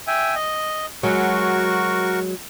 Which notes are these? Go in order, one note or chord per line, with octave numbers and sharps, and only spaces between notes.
E5 G5 G#5
D#5
F#3 G#3 F#4 A#4 C#6